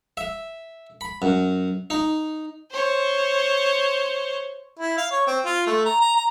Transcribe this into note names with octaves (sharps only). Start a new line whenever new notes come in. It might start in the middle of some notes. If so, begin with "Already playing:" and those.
E5
B5
F#2
D#4
C5 C#5
E4
F5
C#5
C4
F4
A3
A#5
A#5
A#5